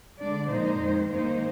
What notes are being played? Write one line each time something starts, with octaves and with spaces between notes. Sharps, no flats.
D3 G#3 D4 D5
A#2 F3 G#3 D#4 C5
F2 D#3 G#3
G2 D#3 A#3 D#4 C5